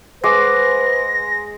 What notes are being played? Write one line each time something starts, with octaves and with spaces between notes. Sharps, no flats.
G#3 B4 C5 F#5 C#6 D6 A#6